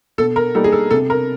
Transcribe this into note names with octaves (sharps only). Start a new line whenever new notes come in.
B2 A4
A#4
G3 A#3 D#4 A4
G#4
A4
C3 A4
A#4